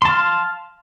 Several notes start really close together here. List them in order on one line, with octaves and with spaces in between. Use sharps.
C6 A5 F5